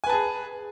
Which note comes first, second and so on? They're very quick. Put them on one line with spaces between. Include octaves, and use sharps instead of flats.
G#5 B4 A5 G#4